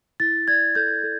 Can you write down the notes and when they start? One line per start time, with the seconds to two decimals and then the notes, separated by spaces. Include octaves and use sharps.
0.20 E4 A6
0.48 D5 G#6
0.75 A4 G6
1.03 A4